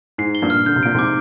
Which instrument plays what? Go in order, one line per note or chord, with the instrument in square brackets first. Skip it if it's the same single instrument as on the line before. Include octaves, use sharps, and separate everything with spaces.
[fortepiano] G#2 [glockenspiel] C7
[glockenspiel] G7
[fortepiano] G2 A#2
[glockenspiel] F6
[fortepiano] D3 [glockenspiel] G6
[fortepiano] C3
[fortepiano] A#2 [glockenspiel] D7
[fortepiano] G#2 C3 [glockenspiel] D6